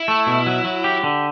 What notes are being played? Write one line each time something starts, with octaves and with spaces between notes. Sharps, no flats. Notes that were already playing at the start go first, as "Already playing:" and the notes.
Already playing: E4
A3
B2
F#3
F#3
G4
D3